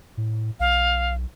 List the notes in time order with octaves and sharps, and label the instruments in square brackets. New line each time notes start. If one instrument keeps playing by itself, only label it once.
[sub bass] A2
[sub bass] B1 [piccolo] F5